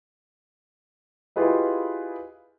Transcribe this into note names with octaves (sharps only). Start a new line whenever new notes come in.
E4 F4 G4 G#4 B4 D#5